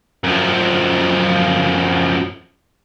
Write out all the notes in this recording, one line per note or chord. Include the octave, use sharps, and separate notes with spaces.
F#2 F3